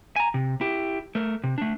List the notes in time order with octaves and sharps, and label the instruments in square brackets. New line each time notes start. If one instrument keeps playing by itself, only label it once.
[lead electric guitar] G#5 A#5
C3
E4 G4
A3 A#4
C3
A3 D4